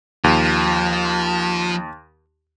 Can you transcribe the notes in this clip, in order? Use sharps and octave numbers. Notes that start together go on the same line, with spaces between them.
D#2 F3